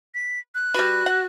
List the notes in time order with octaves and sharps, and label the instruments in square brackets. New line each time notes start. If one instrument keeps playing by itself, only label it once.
[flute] B6
F#6
[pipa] G3 B4 [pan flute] F#4
[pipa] F#5